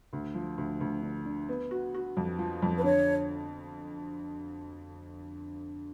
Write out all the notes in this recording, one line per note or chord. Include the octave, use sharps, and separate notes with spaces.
D2
F3
D2
D2
D3
D3
B3
F#4
F#4
F2
F3
F2
B4
D3 C#5